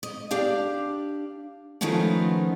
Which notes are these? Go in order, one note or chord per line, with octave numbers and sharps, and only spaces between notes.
D#5
D4 G4 F5
D#3 F3 A3 B3 C#4 D#4